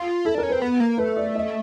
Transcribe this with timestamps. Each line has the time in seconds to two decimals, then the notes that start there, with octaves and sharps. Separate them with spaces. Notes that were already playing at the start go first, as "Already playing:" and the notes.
Already playing: F4
0.25 E4 A4
0.35 D4 A#4
0.43 C#4
0.49 C4 B4
0.62 B3
0.80 A#3
0.98 A3 B4
1.16 D5
1.35 D#5